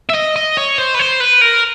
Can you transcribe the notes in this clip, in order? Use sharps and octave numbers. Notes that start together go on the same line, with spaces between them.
E5
D#5
D#5
C#5
C5
B4
C5
B4
A#4